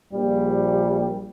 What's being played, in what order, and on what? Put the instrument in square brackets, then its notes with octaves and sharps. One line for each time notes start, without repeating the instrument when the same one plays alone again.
[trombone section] A#1 G3